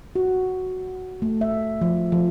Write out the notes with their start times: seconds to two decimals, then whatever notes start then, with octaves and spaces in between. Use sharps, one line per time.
0.16 F#4
1.22 A3
1.41 E5
1.81 F3
2.12 F3